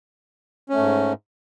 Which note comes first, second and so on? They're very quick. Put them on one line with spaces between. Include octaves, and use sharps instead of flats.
C#4 A3 G#2